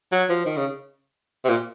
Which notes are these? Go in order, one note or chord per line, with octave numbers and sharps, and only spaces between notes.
F#3
F3
D#3
C#3
C3
A#2